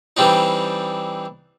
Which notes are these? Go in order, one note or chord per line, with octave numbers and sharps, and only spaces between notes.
E3 G3 C4 D4 D#4